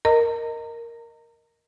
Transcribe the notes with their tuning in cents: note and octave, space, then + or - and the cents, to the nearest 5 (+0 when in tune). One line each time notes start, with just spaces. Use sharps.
A#4 +0 D#5 +0 A#5 -30